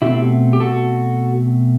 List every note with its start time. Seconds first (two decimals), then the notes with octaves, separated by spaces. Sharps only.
0.02 B2 A3 C4 E4 G4
0.53 G4
0.60 F#4 A4